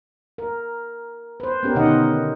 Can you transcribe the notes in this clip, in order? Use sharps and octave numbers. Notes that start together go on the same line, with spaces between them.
A#4
B4 C5
B3 C#4 G4 A#4
B2 D3 D#3 D#4 D#5 F#5